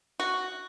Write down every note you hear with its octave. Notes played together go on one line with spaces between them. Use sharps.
F#4